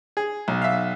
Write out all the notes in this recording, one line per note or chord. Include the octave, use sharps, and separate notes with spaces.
G#4
B1
E5 F5